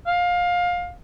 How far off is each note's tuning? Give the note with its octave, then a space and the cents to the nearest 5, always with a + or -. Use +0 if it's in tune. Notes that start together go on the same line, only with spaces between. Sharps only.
F5 +20